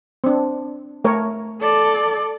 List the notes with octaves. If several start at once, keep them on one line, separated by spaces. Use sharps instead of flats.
C4 D4
A3 A#4 C#5
A4 D5